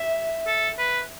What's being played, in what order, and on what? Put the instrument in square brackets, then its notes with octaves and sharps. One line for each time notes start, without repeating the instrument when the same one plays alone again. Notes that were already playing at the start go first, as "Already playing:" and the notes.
Already playing: [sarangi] E5
[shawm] A4
B4